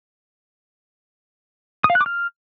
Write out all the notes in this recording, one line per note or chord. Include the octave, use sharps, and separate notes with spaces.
D#6
F5
F#6
D6
F6